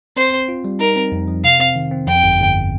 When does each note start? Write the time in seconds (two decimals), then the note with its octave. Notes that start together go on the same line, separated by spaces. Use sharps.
0.17 C4 C5
0.33 C4
0.49 F4
0.65 G3
0.80 D#4 A#4
0.96 C4
1.12 F2
1.28 F3
1.44 C3 F5
1.60 C4
1.76 D#3
1.91 C4
2.07 F2 G5
2.23 G1
2.39 G1